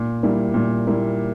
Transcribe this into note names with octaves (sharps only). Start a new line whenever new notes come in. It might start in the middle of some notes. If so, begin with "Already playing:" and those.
Already playing: A#2
G3 A#3 E4
A#2
G3 A#3 E4